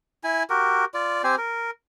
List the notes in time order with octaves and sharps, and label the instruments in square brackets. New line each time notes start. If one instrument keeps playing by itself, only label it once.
[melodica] E4 G#5
F#4 G4 A#4
F4 D5
C4 G4 C5 G#5
A#4